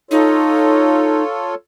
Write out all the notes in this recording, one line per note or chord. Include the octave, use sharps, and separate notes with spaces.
D#4 F4 A4 C#5